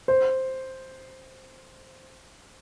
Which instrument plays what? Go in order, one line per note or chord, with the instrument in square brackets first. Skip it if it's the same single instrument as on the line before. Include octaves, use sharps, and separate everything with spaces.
[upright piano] C5